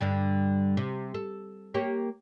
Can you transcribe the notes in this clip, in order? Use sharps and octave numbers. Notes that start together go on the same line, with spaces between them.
G2 D3 G3
C3
A4
A#3 G4 C#5